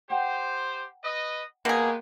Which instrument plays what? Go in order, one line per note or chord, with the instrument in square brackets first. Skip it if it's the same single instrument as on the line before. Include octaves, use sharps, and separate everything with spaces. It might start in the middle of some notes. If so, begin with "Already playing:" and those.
[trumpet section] G4 C5 [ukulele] F#5 G5 A#5
[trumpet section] B4 D#5
[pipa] B2 G#4 [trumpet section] G#3 B3 G4 [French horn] A#3